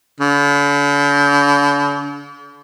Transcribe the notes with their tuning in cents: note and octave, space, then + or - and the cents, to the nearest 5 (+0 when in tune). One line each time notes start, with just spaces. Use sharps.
D3 -45